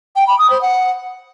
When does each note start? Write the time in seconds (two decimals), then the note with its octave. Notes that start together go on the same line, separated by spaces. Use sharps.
0.16 G5
0.27 B5
0.39 D#6
0.50 C5
0.62 F#5